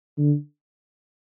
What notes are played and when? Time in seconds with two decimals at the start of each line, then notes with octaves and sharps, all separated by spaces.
0.18 D3